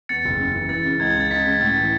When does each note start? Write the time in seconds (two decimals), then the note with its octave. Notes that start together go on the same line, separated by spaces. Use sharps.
0.09 E2 A6 C#7
0.24 F#1
0.40 C#3
0.55 E3
0.69 E3 A6
0.85 C#3
1.00 C#2 G#6
1.10 G#6
1.15 C#3
1.20 A6
1.30 C#2 B6
1.45 C#3
1.61 A2 A6
1.76 E3